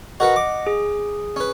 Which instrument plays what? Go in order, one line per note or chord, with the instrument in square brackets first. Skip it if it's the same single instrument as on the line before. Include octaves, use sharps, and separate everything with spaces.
[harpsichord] F#4 A#4 B4 [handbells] D#5 F#5
[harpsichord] D6
[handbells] G#4
[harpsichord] C#4 B4